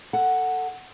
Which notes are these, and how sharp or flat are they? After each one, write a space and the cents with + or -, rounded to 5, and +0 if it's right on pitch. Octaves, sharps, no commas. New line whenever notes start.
A4 +20 F#5 +0